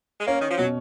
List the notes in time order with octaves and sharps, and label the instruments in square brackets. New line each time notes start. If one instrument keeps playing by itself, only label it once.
[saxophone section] G#3
[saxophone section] A#3 [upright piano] C#4
[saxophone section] D#3
F3
[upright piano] B2 [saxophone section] F#3